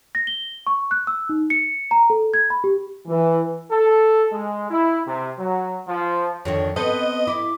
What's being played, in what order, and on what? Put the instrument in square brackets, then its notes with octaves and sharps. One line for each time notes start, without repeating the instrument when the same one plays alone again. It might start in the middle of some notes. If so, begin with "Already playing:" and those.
[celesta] A#6
G7
C#6
F#6
E6
D#4
C#7
A#5
A4
G#6
B5
G4
[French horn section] E3
[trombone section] A4
G#3
E4
C3
F#3
F3
[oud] F2 D3 D#3 [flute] C#5
[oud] B3 C4 A4 [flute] B4 [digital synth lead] D#5
[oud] E4 [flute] D6